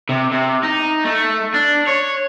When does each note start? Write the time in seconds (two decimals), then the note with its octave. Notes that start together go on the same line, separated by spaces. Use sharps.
0.09 C3
0.32 C3
0.63 D#4
1.04 A3
1.54 D4
1.87 C#5